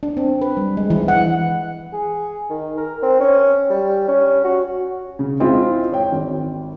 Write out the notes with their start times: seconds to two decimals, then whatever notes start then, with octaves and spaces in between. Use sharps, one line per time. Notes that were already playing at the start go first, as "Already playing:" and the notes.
0.03 D4
0.17 C4
0.42 B4
0.57 G3
0.77 G#3
0.90 E3
1.08 F#5
1.93 G#4
2.50 D#3
2.77 A#4
3.02 C4
3.20 C#4
3.70 G3
4.08 C#4
4.44 F#4
5.19 C#3
5.40 G#3 C4 E4 F4
5.92 C#5 G5
6.12 G#1